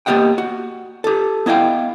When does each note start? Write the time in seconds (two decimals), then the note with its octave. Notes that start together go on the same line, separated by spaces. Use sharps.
0.06 A#3 B3 G4 D#5 F#5 G5
0.38 F#4
1.04 G4 A4
1.46 B3 E4 D#5 F5 G5